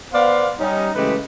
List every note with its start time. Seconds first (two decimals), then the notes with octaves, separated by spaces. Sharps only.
0.13 B3 C5 D5 F5
0.60 G3 C#4 D#4
0.95 C#3 E3 G#3 A3 G4 B4